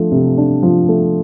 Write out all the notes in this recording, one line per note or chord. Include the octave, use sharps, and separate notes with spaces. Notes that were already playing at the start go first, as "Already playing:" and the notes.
Already playing: F3 A3 D4
C3
D4
F3
A3